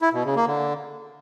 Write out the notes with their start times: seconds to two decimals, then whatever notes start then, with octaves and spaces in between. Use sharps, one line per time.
0.02 E4
0.13 B2
0.24 C#3
0.36 A#3
0.47 D3